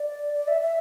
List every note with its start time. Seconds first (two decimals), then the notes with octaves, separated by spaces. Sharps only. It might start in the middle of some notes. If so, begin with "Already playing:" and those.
Already playing: D5
0.34 D5
0.48 E5
0.61 E5